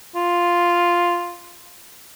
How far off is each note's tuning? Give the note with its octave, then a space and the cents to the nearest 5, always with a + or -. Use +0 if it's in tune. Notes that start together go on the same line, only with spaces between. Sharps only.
F4 +0